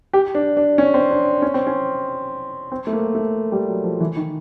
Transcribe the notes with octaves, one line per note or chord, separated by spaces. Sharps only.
G4
D4
D4
C#4
C4
D4
C#4
C4
C#4
C4
A3
A#3
A3
G3
F#3
F3
E3
D#3